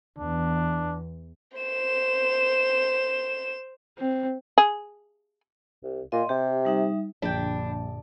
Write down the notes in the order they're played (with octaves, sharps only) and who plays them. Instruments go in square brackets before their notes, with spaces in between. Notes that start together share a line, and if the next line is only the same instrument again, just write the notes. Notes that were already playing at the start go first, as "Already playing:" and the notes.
[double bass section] E2 [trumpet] D4
[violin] C5 E7
[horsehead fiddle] C4
[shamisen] G#4
[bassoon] C2
[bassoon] A#2 [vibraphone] D#5 C6
[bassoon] C3 [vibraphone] G4
[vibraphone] G3 D#4 E5
[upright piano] A#1 [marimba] F#2 A#2 D3 [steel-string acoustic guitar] D4 [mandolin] G5 B5